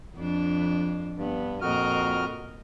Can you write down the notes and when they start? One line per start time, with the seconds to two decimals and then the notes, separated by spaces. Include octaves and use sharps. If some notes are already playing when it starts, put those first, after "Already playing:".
0.16 F2 D4
1.18 G2 B3
1.61 F2 A#2 F#4 A#4 D#5 F6